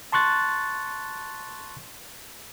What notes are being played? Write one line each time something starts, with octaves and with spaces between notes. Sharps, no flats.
A5 C6 C#6 F#6 A6